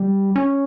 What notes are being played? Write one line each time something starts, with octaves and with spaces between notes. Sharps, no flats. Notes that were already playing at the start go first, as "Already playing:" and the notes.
Already playing: G3
C#4